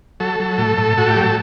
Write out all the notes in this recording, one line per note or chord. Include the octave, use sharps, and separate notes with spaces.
F#3 A4
F#3
A2
A2
A2 F#4
G4
F#3
A4